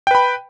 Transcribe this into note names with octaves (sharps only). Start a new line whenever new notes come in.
B4 G5 B5